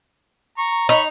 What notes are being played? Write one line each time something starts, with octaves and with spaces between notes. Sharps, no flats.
A#5 C#6
D#4 C#5 B5 C#6